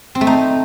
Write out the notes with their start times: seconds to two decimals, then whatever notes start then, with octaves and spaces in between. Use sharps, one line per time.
0.15 C4
0.21 A3
0.27 D#4